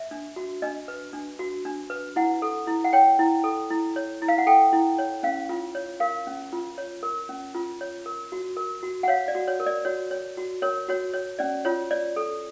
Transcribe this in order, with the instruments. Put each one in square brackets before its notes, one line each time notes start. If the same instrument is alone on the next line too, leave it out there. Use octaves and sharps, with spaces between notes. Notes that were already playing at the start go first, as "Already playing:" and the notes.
Already playing: [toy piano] E5
D4
F#4
D4 D#5
B4
D4
F#4
D4
B4
E4 F#5
A4
E4
F#5
C#5 G5
E4
A4
E4
C#5
E4
F5
F#5
A4 G5
E4
C#5
C#4 F5
F4
C#5
A#4 F5
C#4
F4
C#5
A#4
C#4
F4
C#5
A#4
F#4
A#4
F#4
F#5
C#5 F5
D5
F#4
C#5
A#4
D5
F#4 C#5
C#5
F#4
A#4 C#5
F#4 C#5
C#5
C#4 D5
F4 C#5
C#5 D5
A4